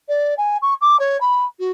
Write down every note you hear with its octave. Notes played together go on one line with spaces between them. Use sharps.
D5
G#5
C#6
D6
C#5
B5
F#4